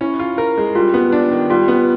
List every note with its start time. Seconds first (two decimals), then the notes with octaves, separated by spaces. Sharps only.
0.01 C#4 E4
0.19 F4
0.38 A#4
0.57 G#3
0.75 G3 F4
0.94 B3
1.12 D4
1.31 D#3
1.50 G3 F4
1.68 B3